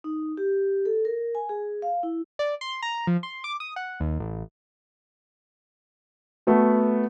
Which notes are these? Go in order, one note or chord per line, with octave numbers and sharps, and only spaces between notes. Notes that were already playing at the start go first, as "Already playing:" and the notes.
D#4
G4
A4
A#4
G#5
G#4
F5
E4
D5
C6
A#5
F3
C6
D6
D#6
F#5
D#2
A1
A3 B3 F#4